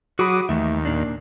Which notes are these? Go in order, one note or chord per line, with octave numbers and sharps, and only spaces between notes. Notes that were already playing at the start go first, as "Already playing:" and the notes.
F#3 F#4 G#4 B5 D6 D#6
D#2 E3 A3 E5
A#2 A#3 D4